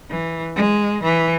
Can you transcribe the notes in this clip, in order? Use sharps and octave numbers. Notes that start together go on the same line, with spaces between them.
E3
G#3
E3